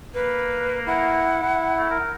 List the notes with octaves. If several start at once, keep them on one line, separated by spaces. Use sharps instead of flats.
A#3 B4
E4 F#5
E4
A3
A#4